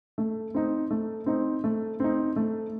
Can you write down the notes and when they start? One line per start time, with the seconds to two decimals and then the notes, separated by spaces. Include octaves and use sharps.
0.18 A3
0.54 C4 D#4
0.91 A3
1.26 C4 D#4
1.64 A3
2.00 C4 D#4
2.36 A3